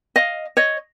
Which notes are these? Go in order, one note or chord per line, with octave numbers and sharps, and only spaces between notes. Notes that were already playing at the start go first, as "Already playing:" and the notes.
D#5 F5
C#5 D#5